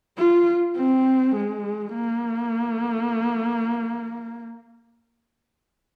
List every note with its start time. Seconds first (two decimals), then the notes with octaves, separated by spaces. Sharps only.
0.18 F4
0.77 C4
1.36 G#3
1.94 A#3